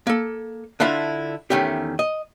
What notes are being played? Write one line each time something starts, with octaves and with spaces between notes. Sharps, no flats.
A#3 A4
D3 D4 E4 F4 E5
E2 D#3 A3 C#4 G4
D#5